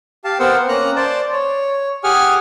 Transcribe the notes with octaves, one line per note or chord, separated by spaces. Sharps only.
G4 F5 A5
B3 C4 A#4 C5 F#5 E6
A#3 C#4 A#5 F#6
C5 D5 A5
C#5
G4 G#4 F#5 G#5 F6